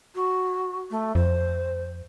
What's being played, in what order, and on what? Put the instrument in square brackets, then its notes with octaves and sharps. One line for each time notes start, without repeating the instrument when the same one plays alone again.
[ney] F#4
A3
[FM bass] F2 [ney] C5